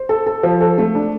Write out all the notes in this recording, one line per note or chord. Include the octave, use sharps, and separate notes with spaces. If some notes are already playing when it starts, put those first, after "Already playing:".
Already playing: C5
A4
A4
F3
A4
A3
D4